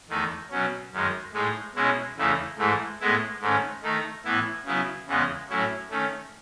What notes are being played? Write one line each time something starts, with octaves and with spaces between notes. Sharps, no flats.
E2 D#3 A3 D#4
B2 F#3 C#4
F#2 D#3 G#3
A2 G#3 D#4
B2 G#3 C#4 E4
E2 C#3 E3 A3 D#4
G#2 E3 A3
A2 G#3 B3 E4
G#2 D#3 A3 C#4
D#3 A3 D#4
A2 E3 B3 E4
C#3 F#3 B3 E4
E2 C#3 E3 G#3 B3
A2 F#3 C#4 E4
D#3 A3 C#4